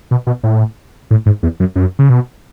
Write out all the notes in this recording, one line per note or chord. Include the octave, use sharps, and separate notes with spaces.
B2
B2
A2
A2
G#2
E2
F#2
F#2
C#3
B2